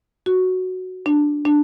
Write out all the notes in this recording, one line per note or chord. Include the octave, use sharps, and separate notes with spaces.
F#4
D4
D4